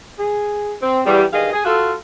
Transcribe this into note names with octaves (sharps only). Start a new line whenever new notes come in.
G#4
C4
E2 G3
G2 D#3 G#4 D#5 F5
G#4
F4 F#4 A4